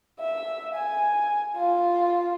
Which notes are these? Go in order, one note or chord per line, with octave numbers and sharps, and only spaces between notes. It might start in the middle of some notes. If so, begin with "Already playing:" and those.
E5
G#5
F4